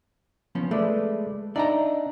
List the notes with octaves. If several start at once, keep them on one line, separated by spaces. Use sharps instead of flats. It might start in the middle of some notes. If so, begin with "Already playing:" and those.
F3 B3 C#4
G#3 A3 B4 D5
D4 D#4 D5 E5 G5 A#5